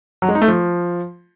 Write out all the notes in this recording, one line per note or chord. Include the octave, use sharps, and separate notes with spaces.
F#3
G#3
D#4
A3
F3